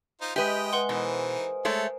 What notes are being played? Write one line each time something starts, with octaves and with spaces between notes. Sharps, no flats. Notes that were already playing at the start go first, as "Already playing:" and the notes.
D#4 F4 C5
G#3 G4 B4 D#5 E5 G5
B4 F#5 G#5 C6
B2 E3 D#4 A#4 C5 D#5
G#3 A3 A4 C#5